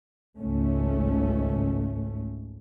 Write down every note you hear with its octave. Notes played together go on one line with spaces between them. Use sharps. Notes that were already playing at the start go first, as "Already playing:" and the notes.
G#1 C#2 G#2 A3 C#4